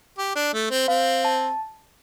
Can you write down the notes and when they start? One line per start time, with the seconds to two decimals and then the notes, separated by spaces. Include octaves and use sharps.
0.18 G4
0.35 D4
0.54 A3
0.71 C4
0.88 C4 F5
1.25 A5